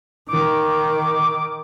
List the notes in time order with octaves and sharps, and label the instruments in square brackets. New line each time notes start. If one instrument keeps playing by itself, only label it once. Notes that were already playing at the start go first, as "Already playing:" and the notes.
[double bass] D#3 [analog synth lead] D6